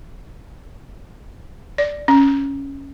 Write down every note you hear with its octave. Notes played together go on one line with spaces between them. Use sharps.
D5
C#4